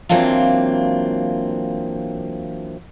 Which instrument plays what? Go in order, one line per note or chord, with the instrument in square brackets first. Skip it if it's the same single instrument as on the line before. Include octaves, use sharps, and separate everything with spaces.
[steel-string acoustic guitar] E3 F#3 A#3 C4 D4 F4